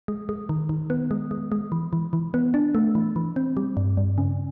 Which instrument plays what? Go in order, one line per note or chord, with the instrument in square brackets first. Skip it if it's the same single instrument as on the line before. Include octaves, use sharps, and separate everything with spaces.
[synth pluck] G#3
G#3
D#3
D#3
B3
G#3
G#3
G#3
E3
E3
E3
B3
D4
A3
E3
E3
C4
G3
G2
G2
C#3